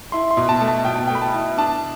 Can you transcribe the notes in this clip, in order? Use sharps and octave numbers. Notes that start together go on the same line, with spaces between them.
E4 C6
C6
B2
A5
A3
A5
B2 G5
A5
A3 G5
B5
A5
E4
D4 A5